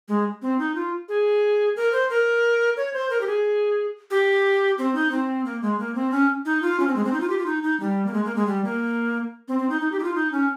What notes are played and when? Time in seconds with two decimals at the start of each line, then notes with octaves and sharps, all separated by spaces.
0.08 G#3
0.42 C4
0.59 D#4
0.75 F4
1.09 G#4
1.76 A#4
1.93 C5
2.10 A#4
2.77 C#5
2.94 C5
3.10 A#4
3.21 G4
3.27 G#4
4.11 G4
4.78 C4
4.95 D#4
5.12 C4
5.45 A#3
5.62 G#3
5.79 A#3
5.95 C4
6.12 C#4
6.45 D#4
6.62 F4
6.80 C#4
6.87 C4
6.96 G#3
7.05 C4
7.13 D#4
7.21 F4
7.30 G4
7.39 F4
7.46 D#4
7.63 D#4
7.80 G3
8.06 A#3
8.13 G#3
8.25 A#3
8.36 G#3
8.47 G3
8.64 A#3
9.48 C4
9.59 C4
9.70 D#4
9.81 D#4
9.92 G4
9.99 D#4
10.04 F4
10.15 D#4
10.32 C#4